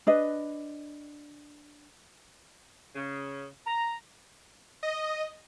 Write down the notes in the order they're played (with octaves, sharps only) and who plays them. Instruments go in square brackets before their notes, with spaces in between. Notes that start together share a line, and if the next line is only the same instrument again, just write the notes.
[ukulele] D4 B4 D#5
[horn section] C#3
A#5
[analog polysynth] D#5